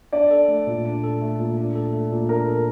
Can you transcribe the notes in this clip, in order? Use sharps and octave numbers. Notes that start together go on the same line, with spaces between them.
D4 D5
A4
A3
A#2
D4
A4
A3
A#2
D4
A4
A3
A#2
D4 A#4
A4